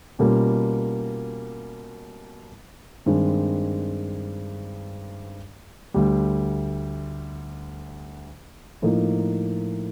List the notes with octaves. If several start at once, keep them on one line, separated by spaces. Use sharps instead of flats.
B2 G3 A#3 C#4 F4
G2 D#3 G#3 C4
D2 D3 G3
A2 F3 A#3 D#4